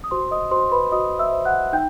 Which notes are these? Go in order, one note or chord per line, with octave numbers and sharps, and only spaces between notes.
D#6
F#4 C5 C6
D#5 D#6
F#4 C5 C6
B4 B5
F#4 D#5 D#6
E5 E6
C5
F#5 F#6
D#4 G5 G6